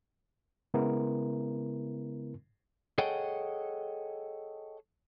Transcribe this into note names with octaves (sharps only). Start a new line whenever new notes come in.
C#3 G#3 B3 E4 A#4
G#4 A4 C#5 D#5 F#5 G5